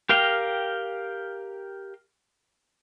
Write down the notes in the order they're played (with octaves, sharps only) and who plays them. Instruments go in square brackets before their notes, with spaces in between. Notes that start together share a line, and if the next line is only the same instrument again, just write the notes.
[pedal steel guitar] G4 A#4 F5 G5